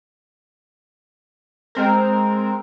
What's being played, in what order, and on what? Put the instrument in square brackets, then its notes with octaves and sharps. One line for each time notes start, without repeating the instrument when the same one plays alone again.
[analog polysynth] G#3 C4 A#4